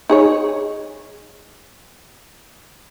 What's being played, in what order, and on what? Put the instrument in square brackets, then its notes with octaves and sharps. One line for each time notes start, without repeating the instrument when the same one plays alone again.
[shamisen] D#4 G#4 C#5